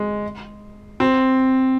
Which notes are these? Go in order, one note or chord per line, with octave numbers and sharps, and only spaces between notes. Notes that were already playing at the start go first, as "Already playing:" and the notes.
Already playing: G#3
C4